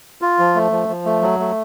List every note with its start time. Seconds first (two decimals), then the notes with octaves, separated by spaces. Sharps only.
0.21 F4
0.39 F3
0.55 A3
0.72 F3
0.88 F3
1.05 A3
1.22 F#3
1.40 A3